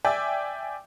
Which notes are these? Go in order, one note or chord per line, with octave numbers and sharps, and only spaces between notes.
D5 E5 G5 G#5